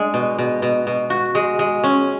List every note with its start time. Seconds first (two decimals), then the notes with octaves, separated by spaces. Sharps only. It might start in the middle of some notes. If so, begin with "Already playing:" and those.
Already playing: G#3 D4
0.14 B2
0.38 B2
0.62 B2
0.87 B2
1.10 F#4
1.35 G#3
1.59 G#3
1.83 C#4